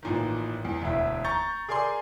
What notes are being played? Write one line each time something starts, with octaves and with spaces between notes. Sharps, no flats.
A1 A#2 D#3
E2
E1 D2 E4
A#5 C#6 G6 A6
G#4 A#4 D5 G#5 C6